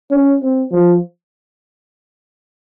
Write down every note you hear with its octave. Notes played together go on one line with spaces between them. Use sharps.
C#4
C4
F3